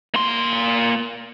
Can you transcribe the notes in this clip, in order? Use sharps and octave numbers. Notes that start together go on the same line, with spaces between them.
A#3 C6